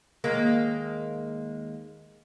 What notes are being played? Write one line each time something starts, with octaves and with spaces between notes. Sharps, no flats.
D#2 G#3 A#3